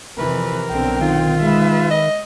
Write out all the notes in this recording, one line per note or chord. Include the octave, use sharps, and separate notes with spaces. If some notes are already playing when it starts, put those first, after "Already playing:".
F2 C3 E3 A#4 B4
B1 D3 C4 G5
D#3 F4
G#3 B4 E5
D#5